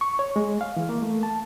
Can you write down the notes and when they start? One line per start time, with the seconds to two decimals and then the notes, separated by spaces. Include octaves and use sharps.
0.01 C#6
0.19 C#5
0.36 G#3
0.61 F5
0.77 E3
0.89 A#3
1.02 A3
1.23 A5